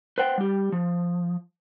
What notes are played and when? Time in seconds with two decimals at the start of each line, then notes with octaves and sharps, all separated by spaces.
0.18 B4 C5 F#5 G5
0.38 G3 G4
0.72 F3